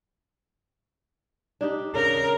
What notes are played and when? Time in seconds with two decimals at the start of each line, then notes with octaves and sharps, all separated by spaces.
1.61 D4 D#4 G4
1.95 C#3 A#4